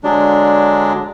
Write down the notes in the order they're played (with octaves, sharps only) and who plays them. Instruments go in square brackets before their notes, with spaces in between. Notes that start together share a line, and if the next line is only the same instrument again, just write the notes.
[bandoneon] D3 F#3 G#3 D4